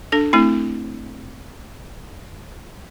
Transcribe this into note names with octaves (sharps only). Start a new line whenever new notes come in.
D4 A4
A3 C4 E4